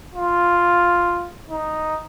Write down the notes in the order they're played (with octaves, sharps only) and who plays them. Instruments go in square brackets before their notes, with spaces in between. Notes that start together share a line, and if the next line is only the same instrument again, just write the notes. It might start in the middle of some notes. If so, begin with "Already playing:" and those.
[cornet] F4
D#4